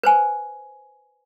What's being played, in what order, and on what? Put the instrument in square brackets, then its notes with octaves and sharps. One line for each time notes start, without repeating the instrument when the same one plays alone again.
[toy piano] B4 C5 G#5